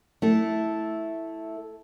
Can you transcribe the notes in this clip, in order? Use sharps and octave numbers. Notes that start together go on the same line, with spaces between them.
A3 E4 A4